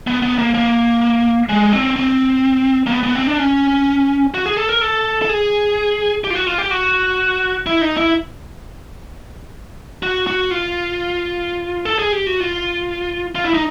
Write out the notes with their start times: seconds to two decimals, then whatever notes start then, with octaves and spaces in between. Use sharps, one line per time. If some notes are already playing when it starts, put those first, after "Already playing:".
0.07 B3
0.22 B3
0.38 A#3
0.54 A#3
1.49 G#3
1.73 C4
1.96 C4
2.86 A#3
2.91 B3
3.03 B3
3.15 C4
3.27 D4
3.39 C#4
4.34 F#4
4.46 G#4
4.57 A4
4.69 A#4
4.81 A4
5.22 A4
5.29 G#4
6.24 G4
6.30 F4
6.35 F#4
6.47 F4
6.58 G4
6.71 F#4
7.66 E4
7.81 D#4
7.97 E4
10.03 F#4
10.27 F#4
10.51 F4
11.85 A4
11.99 G#4
12.12 G4
12.27 F#4
12.40 F4
13.35 F4
13.44 E4
13.54 D#4